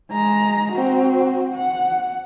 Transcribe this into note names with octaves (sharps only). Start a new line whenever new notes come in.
G#3 A#5
C4 F#4
F#5